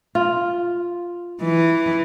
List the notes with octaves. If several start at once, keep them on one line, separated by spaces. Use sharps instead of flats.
F4
E3